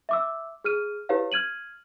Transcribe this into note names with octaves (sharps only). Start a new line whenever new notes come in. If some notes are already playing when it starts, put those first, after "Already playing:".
E5 D6 E6
G#4 F6 D#7
E4 G4 B4 C#5 F5
F6 G#6 D#7 F#7